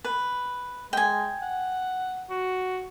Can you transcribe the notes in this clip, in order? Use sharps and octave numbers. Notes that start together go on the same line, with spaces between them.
B4
G#3 G5 G#5
F#5
F#4